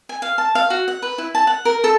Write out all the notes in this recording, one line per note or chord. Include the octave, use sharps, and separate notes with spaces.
G#5
F5
A5
F5
F#4
F#5
B4
E4
A5
F#5
A#4
A4